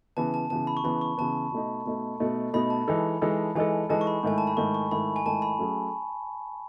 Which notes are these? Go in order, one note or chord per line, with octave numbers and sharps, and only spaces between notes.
C#3 E3 B3 A5
A5
C#3 E3 B3 A5
B5
C#6
C#3 E3 B3 B5
C#6
C#3 E3 B3 A5
B2 A3 D#4
B2 A3 D#4
B2 A3 D#4
B2 A3 D#4 B5
A5
E3 G#3 D#4 A4
E3 G#3 D#4 A4
E3 G#3 D#4 A4 G#5
E3 G#3 D#4 A4 A5
C#6
B5
G#2 D#3 A3 E4 G#5
A5
B5
G#2 D#3 A3 E4 C#6
C#6
G#2 D#3 A3 E4 B5
G#5
G#2 D#3 A3 E4 A5
B5
F#3 A3 C#4 G#4